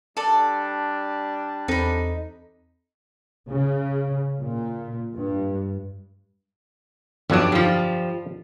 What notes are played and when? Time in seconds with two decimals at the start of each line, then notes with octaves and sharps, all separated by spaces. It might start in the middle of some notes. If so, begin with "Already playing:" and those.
0.17 G3 D4 A4 D5
1.68 E2 C4 D#4 A4 B5
3.50 C#3
4.40 A#2
5.15 G2
7.30 G1 F2 F#3 G3 D4
7.52 F3 G3